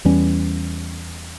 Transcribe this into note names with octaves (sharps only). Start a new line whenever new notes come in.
E2 E3 G3 C#4